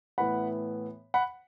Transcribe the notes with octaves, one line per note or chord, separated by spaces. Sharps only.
A2 E3 B3 E4 F#5 B5
F#5 B5